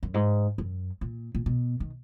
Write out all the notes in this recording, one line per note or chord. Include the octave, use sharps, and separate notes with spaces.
F#2
G#2
F#2
A#2
A#2
B2
D#3